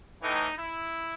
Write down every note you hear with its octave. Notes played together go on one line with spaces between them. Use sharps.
A2 E3 D#4
E4